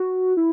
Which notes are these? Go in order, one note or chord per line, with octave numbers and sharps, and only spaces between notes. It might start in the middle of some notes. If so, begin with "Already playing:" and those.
Already playing: F#4
E4